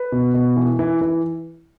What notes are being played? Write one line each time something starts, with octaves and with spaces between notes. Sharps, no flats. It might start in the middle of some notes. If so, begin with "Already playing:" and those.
Already playing: B4
B2
B2
E3
E3
E3